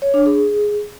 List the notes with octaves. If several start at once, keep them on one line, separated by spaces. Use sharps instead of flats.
C#5
D4
G#4